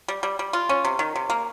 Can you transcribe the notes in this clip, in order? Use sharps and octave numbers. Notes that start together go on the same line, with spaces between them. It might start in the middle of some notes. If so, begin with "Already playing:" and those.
G3
G3
G3
F4
C#4
C3
D#3
C3
A#3